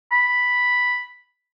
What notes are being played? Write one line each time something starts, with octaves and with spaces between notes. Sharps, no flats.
B5